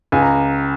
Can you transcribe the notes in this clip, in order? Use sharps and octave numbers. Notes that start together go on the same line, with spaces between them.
C#2 G#5
A#5